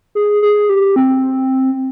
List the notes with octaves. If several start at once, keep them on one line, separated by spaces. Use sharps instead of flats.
G#4
G#4
G4
C4